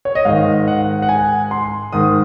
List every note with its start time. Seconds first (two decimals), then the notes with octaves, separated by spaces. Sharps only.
0.05 C#5
0.15 D#5
0.25 G#2 D#3 F5
0.68 F#5
1.02 F#5
1.09 G#5
1.51 C6
1.92 G#2 D#3 D#6